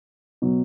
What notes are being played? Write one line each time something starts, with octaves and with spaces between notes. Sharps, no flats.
B2 F#3